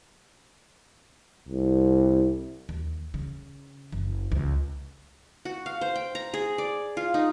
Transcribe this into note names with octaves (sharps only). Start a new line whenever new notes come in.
C2
D#2
C#3
F#1
C#2
F#4
F5
C5
G5
A#5
G#4
D5
F4
D#4